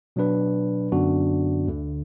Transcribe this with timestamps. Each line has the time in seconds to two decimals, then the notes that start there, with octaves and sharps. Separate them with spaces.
0.16 B2 F#3 D4 B4
0.92 F#2 D3 B3 D4 F#4
1.68 D2 D3 A3